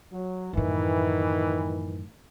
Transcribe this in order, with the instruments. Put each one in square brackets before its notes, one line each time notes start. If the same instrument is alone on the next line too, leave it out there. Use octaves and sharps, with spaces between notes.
[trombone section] F#3
[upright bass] F#2 A2 [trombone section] D#3 E3